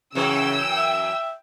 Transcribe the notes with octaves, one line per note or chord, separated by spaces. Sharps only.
F#2 C#3 E3 G5 E6
E5